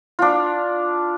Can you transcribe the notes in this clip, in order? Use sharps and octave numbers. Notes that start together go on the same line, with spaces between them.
D4 F4